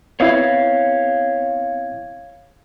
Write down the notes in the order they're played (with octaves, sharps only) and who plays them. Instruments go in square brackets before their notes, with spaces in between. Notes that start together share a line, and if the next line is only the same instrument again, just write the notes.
[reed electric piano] B3 C4 E4 [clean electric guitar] C#5 F5